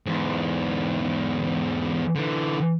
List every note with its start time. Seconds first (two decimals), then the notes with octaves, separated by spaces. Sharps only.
0.06 E2 G#2
2.16 D3 E3